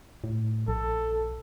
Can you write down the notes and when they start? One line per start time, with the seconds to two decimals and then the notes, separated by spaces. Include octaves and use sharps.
0.24 A2
0.68 A#1 A4